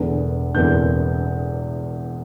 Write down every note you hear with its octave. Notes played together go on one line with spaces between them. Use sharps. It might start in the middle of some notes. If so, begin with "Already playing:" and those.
Already playing: E1 E2 D3 B3 D4
E1 E2 D3 B3 D4 G6